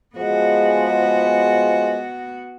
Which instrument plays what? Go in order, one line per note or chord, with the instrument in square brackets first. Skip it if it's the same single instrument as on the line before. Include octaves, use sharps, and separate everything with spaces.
[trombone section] F3 G#3 [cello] B3 F#4